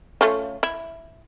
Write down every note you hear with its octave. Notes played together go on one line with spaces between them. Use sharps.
A3 C#4 F4
E4